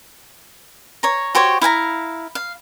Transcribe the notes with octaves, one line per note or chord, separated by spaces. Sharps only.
C#5 A#5
F#4 G4 C5 C#5
E4 F5 G#5 A#5
F5